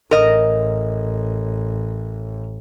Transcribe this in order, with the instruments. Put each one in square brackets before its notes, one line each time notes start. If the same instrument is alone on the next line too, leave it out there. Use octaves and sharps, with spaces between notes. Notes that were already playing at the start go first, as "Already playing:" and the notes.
[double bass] A1 [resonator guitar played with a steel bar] A#4 D#5